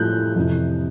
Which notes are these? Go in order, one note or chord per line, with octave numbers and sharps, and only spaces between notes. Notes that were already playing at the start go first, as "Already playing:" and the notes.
Already playing: A2 F3 F#6 G6
F2 C3 E3